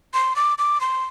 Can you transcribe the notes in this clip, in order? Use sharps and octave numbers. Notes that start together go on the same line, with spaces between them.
C6
D6
D6
C6